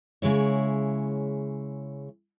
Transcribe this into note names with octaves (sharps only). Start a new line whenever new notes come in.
C#3 G#3 E4 C#5